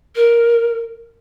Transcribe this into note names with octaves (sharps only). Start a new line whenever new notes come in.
A#4